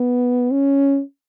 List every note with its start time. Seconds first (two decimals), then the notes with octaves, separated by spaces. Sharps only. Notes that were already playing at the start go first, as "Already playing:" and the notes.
Already playing: B3
0.51 C#4